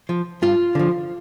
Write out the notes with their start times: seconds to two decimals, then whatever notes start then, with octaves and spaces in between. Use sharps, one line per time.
0.09 F3
0.42 G2 F4
0.75 D3 F3